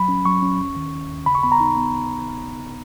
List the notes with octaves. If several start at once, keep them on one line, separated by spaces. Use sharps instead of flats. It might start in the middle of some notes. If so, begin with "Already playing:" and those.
Already playing: F#3 B5
C#4
F#3 C#6
C#4
D#2
D#3
D#2
D#2
C#3 B5
C#6
B3 B5
A#5
D#4
B3